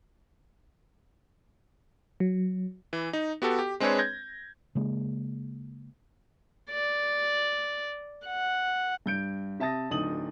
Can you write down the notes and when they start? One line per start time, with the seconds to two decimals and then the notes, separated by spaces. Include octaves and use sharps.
2.20 F#3
2.93 E3
3.13 D#4
3.42 B3 F#4 G4 A4
3.59 G4
3.80 G#3 C4 D4 G#4 B4 C#5
3.98 G6 G#6 A#6
4.75 C#3 G#3 A#3
6.70 D5
8.26 F#5
9.06 G2 G6 D7
9.59 C3 E5 A5 D#6 A6 A#6
9.90 D1 D2 D#4 D#6 F#7